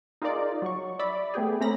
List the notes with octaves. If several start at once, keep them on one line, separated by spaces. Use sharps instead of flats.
D#4 F4 G#4 A#4 D5
F#3 C#6
D5 E5 B5
A3 B3 G4 G#4
A3 C4 C#4 A#5 B5 A#6